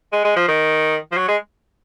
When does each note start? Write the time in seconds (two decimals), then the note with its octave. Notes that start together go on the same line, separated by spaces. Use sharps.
0.13 G#3
0.24 G#3
0.36 F3
0.48 D#3
1.12 F3
1.17 F#3
1.28 G#3